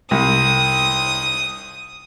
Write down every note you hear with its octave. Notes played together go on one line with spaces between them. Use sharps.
C2 D#6